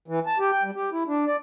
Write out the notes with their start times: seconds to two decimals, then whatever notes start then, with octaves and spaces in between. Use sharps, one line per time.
0.08 E3
0.27 A5
0.39 G4
0.51 G5
0.63 G3
0.76 G4
0.92 E4
1.07 D4
1.26 D5